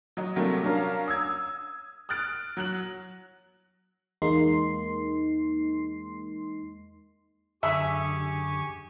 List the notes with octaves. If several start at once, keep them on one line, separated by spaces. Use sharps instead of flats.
F#3 D#5
C3 F#3 G3 A3 A#3
F#3 C#4 D4 A#4 F5
D#6 E6 G#6
D#6 F6 F#6 A6 D7
F#3 F#6 F#7
E2 G#3 A#3 D#4 C6 C7
F#2 D3 G4 G#4 E5 G#5 C#6